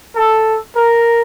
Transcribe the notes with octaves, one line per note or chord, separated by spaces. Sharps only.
A4
A#4